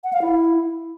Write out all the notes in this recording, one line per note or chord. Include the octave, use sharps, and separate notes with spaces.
F#5
F5
E4